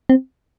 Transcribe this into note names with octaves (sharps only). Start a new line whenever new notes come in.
C4